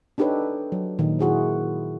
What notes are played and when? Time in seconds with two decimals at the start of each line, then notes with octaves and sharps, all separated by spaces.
0.18 D4 D#4 G4 A4 B4 C#5
0.72 F#3
0.99 A#2 D#3 D#4
1.19 E4 F#4 G#4 C5